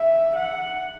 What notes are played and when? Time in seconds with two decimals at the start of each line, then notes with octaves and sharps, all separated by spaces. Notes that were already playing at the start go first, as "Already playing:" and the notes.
Already playing: E5
0.36 F#5